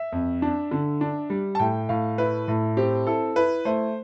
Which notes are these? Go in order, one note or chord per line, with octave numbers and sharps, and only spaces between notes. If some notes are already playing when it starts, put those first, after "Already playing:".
Already playing: E5
F2
D4
D3
D4
G3
A5
A2 G5
A2 F5
E4 B4
A2
C4 G4
E4 A4
E4 B4
A3 C5